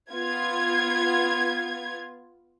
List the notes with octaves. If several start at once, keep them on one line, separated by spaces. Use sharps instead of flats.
B3 F4 G#6